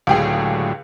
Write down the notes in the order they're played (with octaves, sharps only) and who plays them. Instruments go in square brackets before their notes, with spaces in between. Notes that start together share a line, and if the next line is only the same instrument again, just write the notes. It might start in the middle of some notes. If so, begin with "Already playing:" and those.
[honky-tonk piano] C#2 G4 G#4 [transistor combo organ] A2 D3 F#3